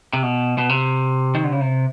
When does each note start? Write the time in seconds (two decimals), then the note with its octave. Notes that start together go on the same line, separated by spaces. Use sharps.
0.13 C3
0.23 B2
0.58 B2
0.69 C3
1.35 D#3
1.44 D3
1.52 C#3
1.61 C3